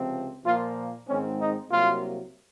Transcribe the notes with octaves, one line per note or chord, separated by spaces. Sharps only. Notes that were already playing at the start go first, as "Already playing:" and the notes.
Already playing: C#2 C3 F3 C4
A#2 F3 A#3 F4
G#2 D#3 G#3 C4 C#4
D#4
C2 C3 F#3 A#3 F4